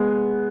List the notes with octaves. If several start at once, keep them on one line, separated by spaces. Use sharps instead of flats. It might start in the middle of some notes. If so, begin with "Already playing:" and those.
Already playing: G#3 B3